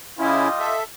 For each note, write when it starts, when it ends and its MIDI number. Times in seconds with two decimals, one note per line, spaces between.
0.19 0.48 49
0.19 0.76 55
0.19 0.48 61
0.19 0.48 64
0.19 0.76 65
0.19 0.76 75
0.60 0.84 69
0.60 0.84 76